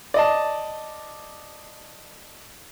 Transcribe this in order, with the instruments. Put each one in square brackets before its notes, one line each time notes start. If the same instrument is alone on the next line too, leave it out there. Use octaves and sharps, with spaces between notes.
[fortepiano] D5 D#5 A5